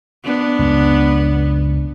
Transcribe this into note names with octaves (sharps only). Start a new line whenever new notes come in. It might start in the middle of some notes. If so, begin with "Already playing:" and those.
B3 D4
C#2 F#2